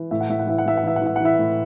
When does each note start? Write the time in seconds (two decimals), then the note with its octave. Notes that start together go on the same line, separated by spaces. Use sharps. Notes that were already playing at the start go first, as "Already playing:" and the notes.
Already playing: E3
0.11 A2 E5
0.20 F#5
0.29 A2 E5
0.39 F#5
0.47 E3 E5
0.58 F#5
0.66 E3 E5
0.77 F#5
0.84 E3 E5
0.96 F#5
1.01 E3 E5
1.16 F#5
1.20 E3 E4 E5
1.39 A2